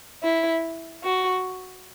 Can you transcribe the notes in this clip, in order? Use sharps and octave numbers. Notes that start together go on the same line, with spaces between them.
E4
F#4